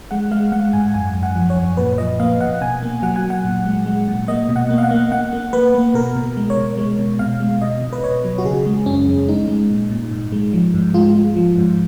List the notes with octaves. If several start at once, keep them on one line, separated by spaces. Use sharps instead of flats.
G#3 F#5
G#3 F5
G#3 F#5
G#2 G#5
F#2 G#5
F#2
F#5
F3
C#5
F#2
A#2 B4
F3 D#5
A#3 F5
A#2 F#5
B2 G#5
A#3
F#3 F#5
G#5
F#3
F#5
A#2
G#3
G#3
A#2
A#3 D#5
B2
F#5
A#3
F5
F#5
A#3
A#3 F#5
A#3
A#3 B4
A#3
B2 A#4
B2
G#3
C#5
B2
G#3
B2
B2 F5
G#3
B2 D#5
B2
B4
B2 C#5
F#3
F#4
C#3 G#4
G#3
F#2 C#4
F#2
G#3 D#4
G#3
A#2
A#2
G#2
G#3
F3
G#2
G#3 F4
G#3
F3
G#2